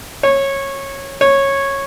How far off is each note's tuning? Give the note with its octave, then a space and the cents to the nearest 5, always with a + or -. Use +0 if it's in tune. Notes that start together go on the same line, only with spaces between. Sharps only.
C#5 -15
C#5 -10